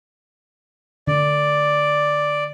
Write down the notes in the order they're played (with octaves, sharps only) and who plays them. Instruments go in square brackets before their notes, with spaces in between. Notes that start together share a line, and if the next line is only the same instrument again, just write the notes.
[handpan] D3 [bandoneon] D5